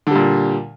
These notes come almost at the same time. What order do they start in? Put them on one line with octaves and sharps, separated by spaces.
D3 G3 A#2